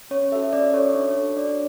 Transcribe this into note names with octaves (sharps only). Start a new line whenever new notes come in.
C#4 C#5
F#4 A4 E5
C#4 D5
F#4 A4 C#5
D4 C#5
F#4 A4
D4 D5